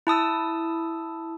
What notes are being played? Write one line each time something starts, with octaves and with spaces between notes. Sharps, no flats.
E4 A5 D#6 E6